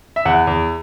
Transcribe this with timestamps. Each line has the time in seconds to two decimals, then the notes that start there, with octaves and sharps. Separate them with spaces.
0.16 E5
0.25 E2 F#5
0.47 E2